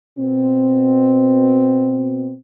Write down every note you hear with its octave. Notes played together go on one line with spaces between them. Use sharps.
B2 C4